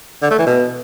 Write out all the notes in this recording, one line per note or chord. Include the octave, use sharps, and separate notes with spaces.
D3
A3
E3
B2